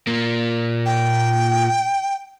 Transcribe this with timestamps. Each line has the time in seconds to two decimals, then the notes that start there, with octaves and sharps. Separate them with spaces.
0.07 A#2 A#3
0.85 G5